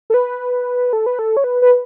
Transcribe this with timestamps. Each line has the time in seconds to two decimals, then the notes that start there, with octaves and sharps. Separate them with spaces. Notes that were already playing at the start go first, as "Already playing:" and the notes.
0.10 A4
0.14 B4
0.93 A4
1.06 B4
1.19 A4
1.37 C#5
1.44 B4
1.62 B4